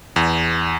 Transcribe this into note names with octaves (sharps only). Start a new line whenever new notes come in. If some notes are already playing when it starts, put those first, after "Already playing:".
E2